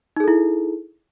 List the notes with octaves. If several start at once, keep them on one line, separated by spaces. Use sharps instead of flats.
D#4 E4 G#4 A4